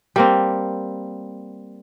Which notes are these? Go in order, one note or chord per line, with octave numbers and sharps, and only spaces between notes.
G3 A#3 C4